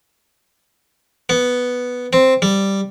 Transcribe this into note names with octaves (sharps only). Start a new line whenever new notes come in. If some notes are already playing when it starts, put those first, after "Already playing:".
B3
C4
G3